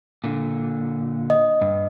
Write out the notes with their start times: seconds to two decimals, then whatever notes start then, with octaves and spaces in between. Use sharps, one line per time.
0.24 A#2 D3
1.30 D#5
1.61 G2